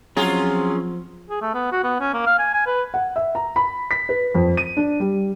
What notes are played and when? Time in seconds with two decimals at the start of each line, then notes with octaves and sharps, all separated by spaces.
0.17 F3 F#3 C4 C#4 F4 G#4
1.30 G#4
1.42 A3
1.54 B3
1.72 F#4
1.84 B3
2.00 C#4
2.13 A#3
2.26 F5
2.39 G#5
2.54 G#5
2.66 B4
2.94 F#5
3.16 E5
3.35 A#5
3.56 B5
3.91 B6
4.09 B4
4.35 F2
4.57 D#7
4.77 D4
5.00 G3